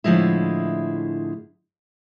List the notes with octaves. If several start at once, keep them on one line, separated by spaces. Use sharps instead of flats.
A2 D3 E3 F3 G#3 E4